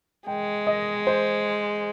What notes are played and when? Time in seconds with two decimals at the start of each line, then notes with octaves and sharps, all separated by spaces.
0.27 G#3 G5
0.67 D#5
1.07 C5